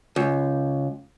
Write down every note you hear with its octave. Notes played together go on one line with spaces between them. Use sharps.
C#2